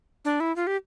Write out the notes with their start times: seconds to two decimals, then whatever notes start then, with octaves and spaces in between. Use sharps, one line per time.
0.25 D4
0.40 E4
0.56 F4
0.67 G4